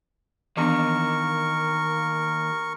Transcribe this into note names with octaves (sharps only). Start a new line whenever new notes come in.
D#2 E3 B3 D4 A#4 C#6